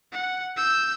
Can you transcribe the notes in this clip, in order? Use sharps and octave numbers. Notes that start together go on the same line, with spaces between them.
F#5
E6 G6